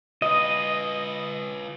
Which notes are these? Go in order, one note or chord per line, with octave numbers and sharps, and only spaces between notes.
F4 B4 D#5